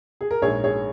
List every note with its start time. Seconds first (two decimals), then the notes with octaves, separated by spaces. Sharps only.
0.21 G#4
0.31 A#4
0.42 A#1 G#2 G#3 G#4 C#5
0.64 G#4 C#5